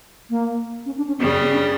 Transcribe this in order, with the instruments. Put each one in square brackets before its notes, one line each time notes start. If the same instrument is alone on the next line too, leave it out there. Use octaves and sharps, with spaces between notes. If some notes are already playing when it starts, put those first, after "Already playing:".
[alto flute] A#3
C#4
D4
C#4
[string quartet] F#2 C#3 G3 [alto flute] B3
[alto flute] B3
C#4
D4